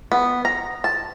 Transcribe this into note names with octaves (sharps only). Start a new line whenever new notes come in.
B3
A#5
A5